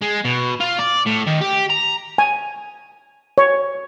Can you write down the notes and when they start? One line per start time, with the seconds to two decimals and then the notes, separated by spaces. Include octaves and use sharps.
0.02 G#3
0.25 B2
0.60 F4
0.79 D5
1.06 A2
1.27 D#3
1.41 G4
1.70 A#5
2.18 G#5
3.38 C#5